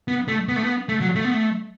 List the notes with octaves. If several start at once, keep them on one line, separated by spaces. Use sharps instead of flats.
B3
A3
B3
A3
B3
A3
F#3
A3
B3
A3